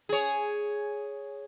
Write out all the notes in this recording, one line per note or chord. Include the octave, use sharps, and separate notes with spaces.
G#4 C#5